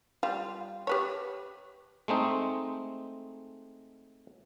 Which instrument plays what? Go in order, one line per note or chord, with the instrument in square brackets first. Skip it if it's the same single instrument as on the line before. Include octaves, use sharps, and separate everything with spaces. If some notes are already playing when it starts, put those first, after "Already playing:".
[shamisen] G3 F4
G4 B4 C#5
[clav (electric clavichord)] G#3 A3 C4 D#4